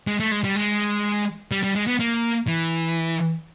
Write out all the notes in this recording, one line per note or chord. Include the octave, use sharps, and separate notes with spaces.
G#3
A3
G#3
G3
G#3
G3
G3
G#3
B3
A#3
E3